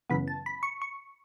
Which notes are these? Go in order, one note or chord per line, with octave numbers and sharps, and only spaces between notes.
F#2 C#3 E3 B3 B5
A5
B5
C#6
C#6